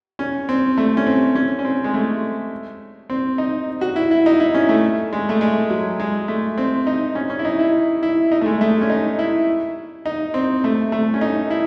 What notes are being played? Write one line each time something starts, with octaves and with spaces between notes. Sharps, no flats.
C#4
C4
A3
C#4
C4
C#4
C#4
C4
G#3
A3
C4
D#4
F#4
E4
E4
D#4
E4
C#4
A3
G#3
A3
G#3
F#3
G#3
A3
C4
D#4
C#4
C#4
E4
D#4
E4
E4
D#4
A3
G#3
A3
C#4
D#4
E4
D#4
C4
A3
A3
C#4
D#4
E4